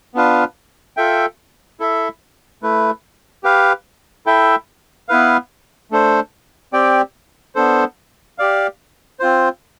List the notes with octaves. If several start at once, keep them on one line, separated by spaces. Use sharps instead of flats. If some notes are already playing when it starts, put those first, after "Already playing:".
B3 D4 F4 B4 F5
F4 A4 E5 G5
E4 A4 E5
A3 E4 B4
G4 B4 F5
E4 A4 E5 G5
B3 E4 B4 F5
A3 D4 A4 C5
C4 G4 D5 G5
B3 D4 A4 C5
G4 D5 F5
C4 F4 C5